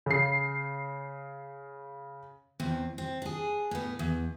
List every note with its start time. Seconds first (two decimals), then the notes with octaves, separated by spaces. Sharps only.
0.06 C#3 C7
2.60 E2 C4
2.98 C4
3.22 D4 G#4
3.71 A2 B3
3.99 E2